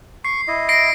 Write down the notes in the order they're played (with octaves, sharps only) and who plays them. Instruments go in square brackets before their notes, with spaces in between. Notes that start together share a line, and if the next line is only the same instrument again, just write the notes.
[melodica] C#6 [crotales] C7
[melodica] E4 D#5
[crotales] A#6 C7 D7